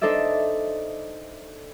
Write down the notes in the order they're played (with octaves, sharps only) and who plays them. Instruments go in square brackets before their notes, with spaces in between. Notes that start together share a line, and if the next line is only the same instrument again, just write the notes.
[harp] D4 D#4 A4 C5 D5 E5